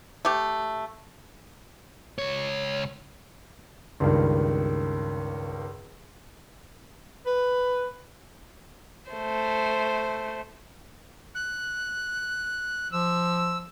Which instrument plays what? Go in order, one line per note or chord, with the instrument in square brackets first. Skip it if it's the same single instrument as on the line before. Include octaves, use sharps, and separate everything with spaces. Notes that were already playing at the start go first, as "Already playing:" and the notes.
[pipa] A3 G4
[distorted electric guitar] C#2 C#5
[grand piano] C#2 G2 D#3
[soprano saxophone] B4
[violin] A3 C5
[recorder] F#6
[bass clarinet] F3 [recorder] E6